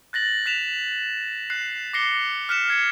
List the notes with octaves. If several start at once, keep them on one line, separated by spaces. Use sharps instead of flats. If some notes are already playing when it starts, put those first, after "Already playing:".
F#6 A6 A#6 F#7
F#6 B6 E7 F7
F#6 C7
D6 A#6 C7 C#7 G7
F6 F#6 B6 C#7 E7
F6 G#6 C7 C#7